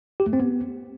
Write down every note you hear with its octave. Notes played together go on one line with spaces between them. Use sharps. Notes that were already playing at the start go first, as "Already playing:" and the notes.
G4
A3
C4
B3